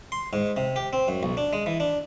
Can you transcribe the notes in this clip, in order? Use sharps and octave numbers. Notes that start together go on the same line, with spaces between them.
C6
G#2
C3
G4
C4
F#2
B1
D4
G#3
E3
D4